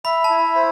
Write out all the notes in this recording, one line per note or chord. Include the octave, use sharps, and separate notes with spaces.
E5 B5
A5
E4
C5